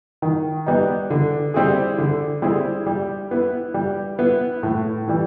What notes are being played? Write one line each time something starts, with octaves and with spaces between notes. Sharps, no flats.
D#3
G3 B3 D#4
D3
G3 C4 E4 G#4
D3
G3 C4 E4 G#4
G3
B3 E4
G3
B3 E4
A2
E3 G3